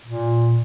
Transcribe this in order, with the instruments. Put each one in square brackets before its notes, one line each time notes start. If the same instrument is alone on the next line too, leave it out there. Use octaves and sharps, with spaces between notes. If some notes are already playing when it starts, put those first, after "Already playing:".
[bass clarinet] A#2